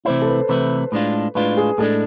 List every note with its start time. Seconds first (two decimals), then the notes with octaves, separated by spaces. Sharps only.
0.05 C3 E3 A3 E4 C5
0.22 A4
0.27 B4
0.49 C3 E3 A3 E4 B4
0.92 A2 G#3 D4 F4
1.35 A2 G#3 D4 F4 B4
1.57 G#4
1.78 A2 G#3 D4 A4